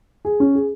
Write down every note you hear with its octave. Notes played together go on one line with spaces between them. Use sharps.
G#4
C#4
G#4